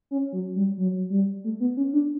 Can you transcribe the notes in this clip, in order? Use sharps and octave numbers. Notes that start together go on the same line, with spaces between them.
C#4
F#3
G3
F#3
G3
A3
B3
C#4
D4